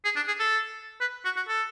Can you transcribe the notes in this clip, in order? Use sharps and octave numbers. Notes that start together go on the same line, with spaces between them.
G#4
D4
G#4
A4
B4
F#4
F#4
A4